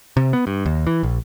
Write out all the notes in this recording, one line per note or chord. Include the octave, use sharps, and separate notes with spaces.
C3
B3
G2
D#2
E3
A#1